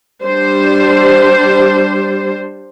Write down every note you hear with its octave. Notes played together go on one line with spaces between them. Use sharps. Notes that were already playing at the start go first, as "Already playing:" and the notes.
G3 D4 C5